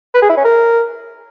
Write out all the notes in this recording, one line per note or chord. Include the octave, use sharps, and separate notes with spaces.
B4
G#4
E4
C#4
A#4